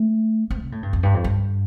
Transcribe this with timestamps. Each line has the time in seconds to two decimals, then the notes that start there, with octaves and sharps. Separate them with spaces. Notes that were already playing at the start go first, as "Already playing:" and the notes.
Already playing: A3
0.50 C4
0.61 C3
0.72 A2
0.83 G2
0.93 F2
1.03 G2
1.14 F2
1.24 G2